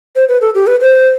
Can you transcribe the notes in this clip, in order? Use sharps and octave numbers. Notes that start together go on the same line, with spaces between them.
C5
B4
A4
G4
B4
C5